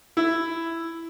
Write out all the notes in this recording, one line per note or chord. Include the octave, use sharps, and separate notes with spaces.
E4